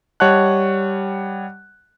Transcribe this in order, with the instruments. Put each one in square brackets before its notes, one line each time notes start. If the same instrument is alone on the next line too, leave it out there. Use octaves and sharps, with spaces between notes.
[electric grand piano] G3 C#5 D#5 F#5 A5 F#6